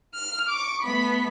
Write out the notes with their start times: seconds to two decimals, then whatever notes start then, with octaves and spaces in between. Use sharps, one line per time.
0.14 F6
0.49 C#6 D6
0.82 A3 B3 B5